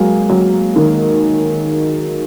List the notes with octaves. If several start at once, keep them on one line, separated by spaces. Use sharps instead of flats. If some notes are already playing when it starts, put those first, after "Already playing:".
Already playing: F#3 G#3 A#3
F#3
D#3